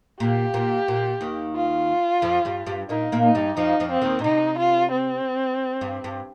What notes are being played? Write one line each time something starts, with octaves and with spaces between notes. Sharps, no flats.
A#2 G4
A#2
A#2
D#2 D#3
F4
F2 F3
G2 G3
G2 G3
A#2 A#3 D#4
A#2 A#3
D#4
G2 G3
F2 F3 D#4
F2 F3
C4
D#2 D#3
A#2
C3 D#4
F4
C4
G2
G2